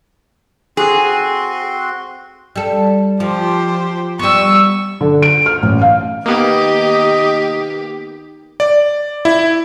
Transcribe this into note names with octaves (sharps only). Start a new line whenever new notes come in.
C4 F#4 G#4 C6
G3 A4
F3 G4 C5
G3 B3 C#6 E6
D3
D7
F6
A1
F5
D#3 A#3 B3 D#4 G4 D#5
D5
E4